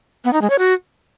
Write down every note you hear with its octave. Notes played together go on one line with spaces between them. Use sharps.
B3
D#4
G#3
C#5
F#4